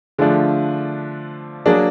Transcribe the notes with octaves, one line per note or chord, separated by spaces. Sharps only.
D3 F3 A3 D4 F4 G#4
F#3 A#3 D4 G#4